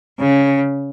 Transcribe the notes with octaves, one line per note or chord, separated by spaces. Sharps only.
C#3